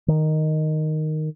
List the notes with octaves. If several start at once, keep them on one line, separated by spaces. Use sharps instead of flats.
D#3